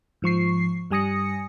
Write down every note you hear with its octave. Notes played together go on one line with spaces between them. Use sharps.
G#2 F3 C#6 C7
G2 G3 G#5 D#6 A#6 C#7